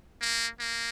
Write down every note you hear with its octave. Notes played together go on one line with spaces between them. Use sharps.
A#3
A#3